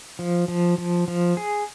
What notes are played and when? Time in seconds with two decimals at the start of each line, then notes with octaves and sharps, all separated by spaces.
0.19 F3
0.48 F3
0.78 F3
1.08 F3
1.37 G#4